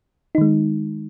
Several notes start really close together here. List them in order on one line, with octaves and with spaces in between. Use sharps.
D#4 D#3 G#3